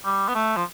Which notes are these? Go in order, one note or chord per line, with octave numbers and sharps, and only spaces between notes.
G3
B3
A3
F3